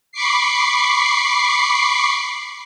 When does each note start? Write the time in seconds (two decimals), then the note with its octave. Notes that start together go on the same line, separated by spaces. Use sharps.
0.12 B5 C#6 D6 C7